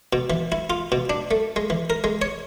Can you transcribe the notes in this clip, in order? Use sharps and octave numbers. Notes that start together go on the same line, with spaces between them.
B2
E3
E4
F4
B2
D4
A3
G#3
E3
A#4
G#3
C#5